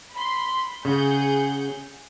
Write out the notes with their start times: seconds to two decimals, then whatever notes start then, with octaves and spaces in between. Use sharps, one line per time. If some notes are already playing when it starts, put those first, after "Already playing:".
0.13 B5 C6
0.85 C#3 G#4 F#5 G6